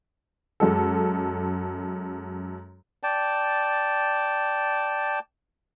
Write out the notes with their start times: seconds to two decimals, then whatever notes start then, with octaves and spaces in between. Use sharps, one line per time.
0.60 F#2 G#3 A4
3.03 D5 G5 A5